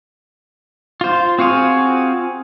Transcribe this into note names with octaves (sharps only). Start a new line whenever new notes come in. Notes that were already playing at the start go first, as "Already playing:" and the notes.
F4 C5
C4 F4 F#4 G#4 F5